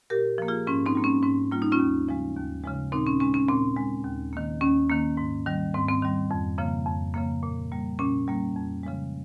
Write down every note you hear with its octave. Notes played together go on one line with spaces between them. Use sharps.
A#2 G4 A#4
F3 A#3
F4 G#4
G#2 C#4 F4
C4 D#4
G3 A#3
C#4
G#2 C#4
G3 A#3 F4
D#4
C#4 F4
D#2
C#3 F3 G#3
D#2
C#3 F3 G#3
A#2 C4 D#4
C#4
G#3 C#4
C#4
A#2 C4
G#3
D#2
D#3 A#3
D#2 C#4
D#3 A#3
G#2
D#3 G3
G#2 C4
C4
D#3 G3
F2
C#3 F3 A#3
F2
C#3 F3 A#3
A#2
G3 A#3
A#2 C#4
G3 A#3
F2
C#3 F3 G#3